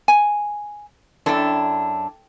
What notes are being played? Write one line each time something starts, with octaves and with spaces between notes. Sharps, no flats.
G#5
F#2 D4 E4 A4 G5